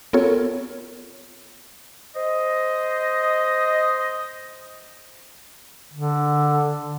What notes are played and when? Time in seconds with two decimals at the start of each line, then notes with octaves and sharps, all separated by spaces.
0.13 B3 C4 F4 A4 A#4 C#5
2.16 C5 D#5
5.93 D3